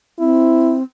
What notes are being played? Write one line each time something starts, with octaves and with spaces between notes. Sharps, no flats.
C4 E4